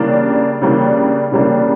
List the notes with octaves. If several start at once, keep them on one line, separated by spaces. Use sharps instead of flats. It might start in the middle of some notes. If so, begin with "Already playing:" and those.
Already playing: C#3 E3 G3 A#3 D4
C#3 E3 G3 A#3 D4
C#3 E3 G3 A#3 D4